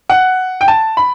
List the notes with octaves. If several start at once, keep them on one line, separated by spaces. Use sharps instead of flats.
F#5
G5
A5
B5